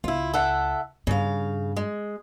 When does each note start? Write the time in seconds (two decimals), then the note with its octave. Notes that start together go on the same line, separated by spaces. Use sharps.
0.04 C#2 E4 F4
0.34 A4 E5 F#5
1.07 G2 C#3 F5
1.76 G#3